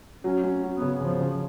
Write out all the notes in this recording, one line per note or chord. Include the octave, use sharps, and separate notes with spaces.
F#3 C#4
C#4
F#3
B3
C#3
C#3 F3
C#3